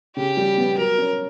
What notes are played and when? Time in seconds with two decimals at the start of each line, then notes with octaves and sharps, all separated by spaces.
0.16 C#3 G4
0.37 G3
0.58 B3
0.77 F#3 A#4
0.98 C#4